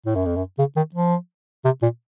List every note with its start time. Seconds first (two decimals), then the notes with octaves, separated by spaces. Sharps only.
0.06 A2
0.16 F#2
0.26 F2
0.36 F#2
0.58 C#3
0.76 D#3
0.94 F3
1.64 C3
1.82 A#2